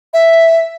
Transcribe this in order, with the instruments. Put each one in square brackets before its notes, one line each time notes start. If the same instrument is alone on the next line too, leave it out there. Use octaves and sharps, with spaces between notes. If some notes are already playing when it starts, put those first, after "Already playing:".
[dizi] E5